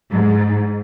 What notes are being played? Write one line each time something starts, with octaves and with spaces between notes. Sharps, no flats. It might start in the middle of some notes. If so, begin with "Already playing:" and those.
G#2